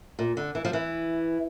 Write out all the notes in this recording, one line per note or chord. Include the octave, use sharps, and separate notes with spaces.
A#2
D3
E3
F3
E3